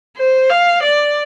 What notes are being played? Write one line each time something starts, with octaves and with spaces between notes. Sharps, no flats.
C5
F5
D5